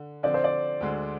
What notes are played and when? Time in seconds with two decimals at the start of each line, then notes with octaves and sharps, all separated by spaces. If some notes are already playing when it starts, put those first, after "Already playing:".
Already playing: D3
0.23 D3 F3 C4 D5
0.34 C5
0.44 D5
0.81 D2 D3 G#3